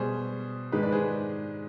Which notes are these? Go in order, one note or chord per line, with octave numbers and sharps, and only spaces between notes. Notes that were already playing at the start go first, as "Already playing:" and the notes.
Already playing: B2 G3 G#4 C5
G#2 D#3 G#3 G4 B4
B4 D5
G#4 C5